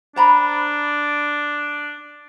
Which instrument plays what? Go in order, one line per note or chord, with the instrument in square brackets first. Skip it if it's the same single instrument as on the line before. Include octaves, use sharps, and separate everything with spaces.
[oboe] D4 [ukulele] C5 A#5 B5